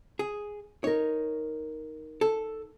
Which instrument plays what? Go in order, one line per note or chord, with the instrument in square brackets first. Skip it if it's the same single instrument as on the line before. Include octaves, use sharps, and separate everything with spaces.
[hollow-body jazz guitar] G#4
[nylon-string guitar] D#4 A#4 [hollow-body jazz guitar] C#5
[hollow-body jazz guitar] A4